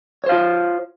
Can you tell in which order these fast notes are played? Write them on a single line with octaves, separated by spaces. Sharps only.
C#5 C5 F5 F4